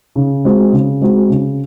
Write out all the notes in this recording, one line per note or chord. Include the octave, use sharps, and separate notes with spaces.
C#3
G#3 C4 F#4
C#3
G#3 C4 F#4
C#3